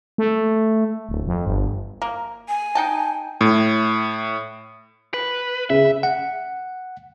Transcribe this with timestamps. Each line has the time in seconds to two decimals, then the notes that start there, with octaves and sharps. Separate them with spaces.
0.18 A3
1.09 D1
1.27 F2
1.46 G1
2.02 A#3
2.48 G#5
2.75 D#4 G5 A5
3.41 A2
5.14 B4
5.70 C#3 E5
6.03 F#5